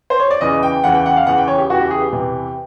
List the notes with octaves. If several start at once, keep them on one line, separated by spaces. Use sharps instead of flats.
C5
C#5
D5
E2 C#3 E3 D#5
G5
E2 C#3 E3 F#5
G5
F#5
F5
E2 C#3 E3 F#5
G5
C#5
G4
E2 C#3 E3 F#4
G4
G#4
G4
E2 C3 E3